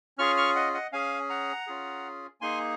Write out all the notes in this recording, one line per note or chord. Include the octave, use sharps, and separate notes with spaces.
C#4 F4 G#4 C#6 F6
C#6 F6
D#5 F#5
D#5 F#5
C#4 G#4 F5 G#5
F#5 A#5
C#4 F4 G#4
A#3 D#4 G#4 G#5 C6